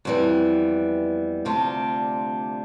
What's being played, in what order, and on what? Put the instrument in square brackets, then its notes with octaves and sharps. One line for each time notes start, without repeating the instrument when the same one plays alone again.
[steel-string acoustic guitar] F2 E3 G3 B3
D2 C3 G3 D4 F4